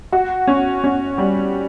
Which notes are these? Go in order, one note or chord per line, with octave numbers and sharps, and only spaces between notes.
F#4
C#4
C#4
G3